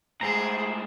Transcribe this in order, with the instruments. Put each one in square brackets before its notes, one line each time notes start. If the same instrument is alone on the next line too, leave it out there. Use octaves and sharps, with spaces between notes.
[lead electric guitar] A2 G#3 [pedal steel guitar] E4 C5 A#5 [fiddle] G#4